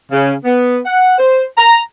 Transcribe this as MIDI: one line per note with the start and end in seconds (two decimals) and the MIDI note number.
0.11 0.33 49
0.45 0.78 59
0.86 1.14 78
1.19 1.44 72
1.57 1.78 82